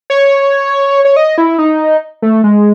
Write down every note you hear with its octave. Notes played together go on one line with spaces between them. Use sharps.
C#5
C#5
D#5
E4
D#4
A3
G#3